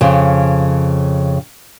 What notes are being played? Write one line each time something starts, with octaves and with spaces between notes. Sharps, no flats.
F2 C#3